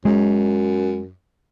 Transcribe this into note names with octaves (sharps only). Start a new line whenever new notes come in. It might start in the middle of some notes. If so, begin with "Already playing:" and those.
F#2 G#3